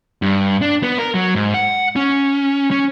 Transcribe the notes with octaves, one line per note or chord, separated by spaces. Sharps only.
G2
D4
B3
A#4
F#3
G#2
F#5
C#4
C#4